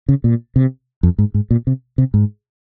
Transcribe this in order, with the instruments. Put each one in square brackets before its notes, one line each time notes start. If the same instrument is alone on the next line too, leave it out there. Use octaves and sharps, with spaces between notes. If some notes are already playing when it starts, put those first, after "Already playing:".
[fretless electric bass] C#3
A#2
C3
F2
G#2
G#2
A#2
C3
C3
G#2